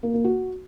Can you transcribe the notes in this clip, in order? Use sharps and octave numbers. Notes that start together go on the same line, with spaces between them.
A#3
A#3
F#4